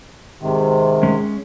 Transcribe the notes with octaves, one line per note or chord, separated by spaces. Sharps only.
G#2 C3 D#3
G#3 C#4